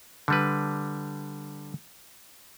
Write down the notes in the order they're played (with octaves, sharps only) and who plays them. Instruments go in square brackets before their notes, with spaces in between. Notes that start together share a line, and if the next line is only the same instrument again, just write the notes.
[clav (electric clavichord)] D3 G3 B4